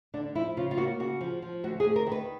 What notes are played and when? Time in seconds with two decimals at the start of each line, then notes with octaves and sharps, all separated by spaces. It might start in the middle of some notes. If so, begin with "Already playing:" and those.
0.14 D3 D4
0.35 F3 E4
0.57 C#3 F4
0.71 F4
0.77 A#3 F#4
0.99 C#3 F#4
1.21 F3
1.42 F3
1.63 D2 F#4
1.80 G#4
1.85 D2
1.96 A#4
2.06 D#3
2.12 B4